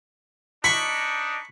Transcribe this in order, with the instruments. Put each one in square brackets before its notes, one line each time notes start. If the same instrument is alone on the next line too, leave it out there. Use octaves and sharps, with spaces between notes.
[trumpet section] D4 D#4 [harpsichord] B5 C#6 [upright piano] B6